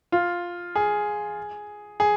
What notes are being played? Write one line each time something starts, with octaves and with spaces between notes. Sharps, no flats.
F4
G#4
G#4